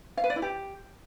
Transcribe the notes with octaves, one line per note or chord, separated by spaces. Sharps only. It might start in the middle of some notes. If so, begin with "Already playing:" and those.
F5
B4
D5
E4
G4